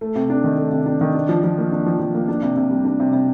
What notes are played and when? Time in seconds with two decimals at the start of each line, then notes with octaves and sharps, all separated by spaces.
0.01 A3
0.16 C3
0.30 D4
0.44 D#3
0.57 A3
0.72 C3
0.86 D4
1.01 D#3
1.15 D4
1.29 F3
1.44 F3
1.58 A#3
1.72 D4
1.86 F3
1.99 F3
2.15 A#3
2.28 D4
2.42 C3
2.56 C3
2.71 G3
2.85 D4
3.00 C3
3.13 C3